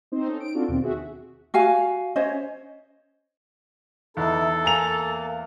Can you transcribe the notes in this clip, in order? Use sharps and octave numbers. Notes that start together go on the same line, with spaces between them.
C4 D#4 C5
C#4 D#4 A4
D7
C4 D4 F4 F#4 A4
D#2 B2 D#3 C4
F#4 G#4 E5
F#4 F5 G#5
C#4 C5 C#5 D#5
E2 D#4 E4 A4
A#3 G#5 A#5 F7